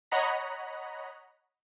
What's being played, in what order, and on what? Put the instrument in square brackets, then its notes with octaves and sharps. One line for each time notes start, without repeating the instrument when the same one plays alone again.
[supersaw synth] C#5 D#5 F#5 A#5 B5